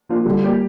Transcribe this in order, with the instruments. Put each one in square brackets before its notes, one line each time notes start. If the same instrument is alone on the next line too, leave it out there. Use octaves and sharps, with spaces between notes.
[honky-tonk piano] F3 A#3 D4 F4
[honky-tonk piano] D3 [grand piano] G3
[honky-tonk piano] A#3 G4 D5